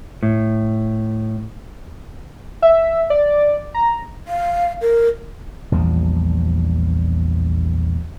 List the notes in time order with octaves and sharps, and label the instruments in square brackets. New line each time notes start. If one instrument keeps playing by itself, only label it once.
[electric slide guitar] A2
[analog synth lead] E5
D5
A#5
[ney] F5
A#4
[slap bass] A#1 E2 F3 G3